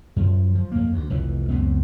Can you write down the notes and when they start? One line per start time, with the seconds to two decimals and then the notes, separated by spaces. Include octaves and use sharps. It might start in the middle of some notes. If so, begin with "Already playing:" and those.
0.16 F#2 F3
0.55 F3
0.72 F2 A#3
0.93 D2
1.10 F1 C2 F2 E3
1.50 C#2 F#2 B3 C4